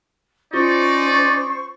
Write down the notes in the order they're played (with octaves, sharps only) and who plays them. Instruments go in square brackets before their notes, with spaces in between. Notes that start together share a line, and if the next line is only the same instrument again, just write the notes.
[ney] C#4 [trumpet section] D#4 D5 [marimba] F4 [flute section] C5 C#6